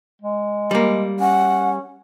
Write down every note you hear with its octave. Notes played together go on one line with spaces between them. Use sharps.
G#3
G3 A#3
C#4 F#5